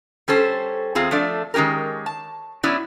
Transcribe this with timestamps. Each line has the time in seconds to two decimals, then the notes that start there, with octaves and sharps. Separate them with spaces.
0.28 G3 C#4 A4 C5
0.95 E2 C4 F4 G#4
1.11 F3 A3 D4 D5
1.54 D#3 G#3 C#4 G4 A#4
2.06 A5
2.63 F#3 B3 C#4 E4 D5